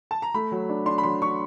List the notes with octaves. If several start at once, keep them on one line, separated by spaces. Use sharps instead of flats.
A5
A#5
A3 B5
F#3
D4
D4 C6
B5
F#3 C6
D4 C#6